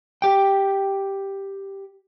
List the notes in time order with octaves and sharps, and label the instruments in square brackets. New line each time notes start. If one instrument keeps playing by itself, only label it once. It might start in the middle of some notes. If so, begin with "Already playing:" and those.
[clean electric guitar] G4 G5